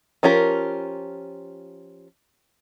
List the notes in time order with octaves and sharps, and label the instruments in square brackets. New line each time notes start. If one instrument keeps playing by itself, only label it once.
[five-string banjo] F3 C#4 F4 G4 A#4